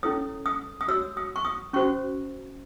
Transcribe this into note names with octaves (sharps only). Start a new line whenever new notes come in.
C#4 E4 A4 C#5 D#6
D#6
D#6
F#4 C#5 E6
D#6
C#6
D#6
C#4 F#4 C5 C#6